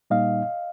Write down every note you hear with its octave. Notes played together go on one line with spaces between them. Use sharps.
A#2 G3 A#3 D#4 D#5 F5